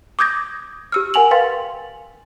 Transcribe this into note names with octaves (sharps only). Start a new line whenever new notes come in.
D6 D#6 G6 G#6 A#6
G4 E6 F6
A#4 F#5 G#5 F7 F#7
A#4 B4 F5 G5 C6 A6